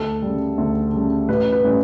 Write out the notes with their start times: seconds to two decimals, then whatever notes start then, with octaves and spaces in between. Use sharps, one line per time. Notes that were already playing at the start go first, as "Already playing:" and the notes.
Already playing: D2 A4
0.22 C#3 G3
0.58 D2
0.93 C#3 G3
1.28 A1 B4
1.52 B4
1.64 A2 G3 C#4